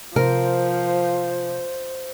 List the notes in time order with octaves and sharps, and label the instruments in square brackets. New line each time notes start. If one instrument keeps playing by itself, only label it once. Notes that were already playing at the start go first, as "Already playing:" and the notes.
[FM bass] C3 [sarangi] F3 [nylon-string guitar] A#4 [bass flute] C5